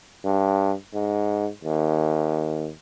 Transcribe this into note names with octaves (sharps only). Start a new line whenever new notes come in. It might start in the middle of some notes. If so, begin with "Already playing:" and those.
G2
G#2
D#2